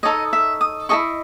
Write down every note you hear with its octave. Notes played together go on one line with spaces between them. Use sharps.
D#4 A4 C#5 D#5
E5
D#6
E4 A4 D#5 C#6